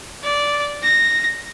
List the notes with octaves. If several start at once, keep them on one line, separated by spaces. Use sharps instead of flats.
D5
A#6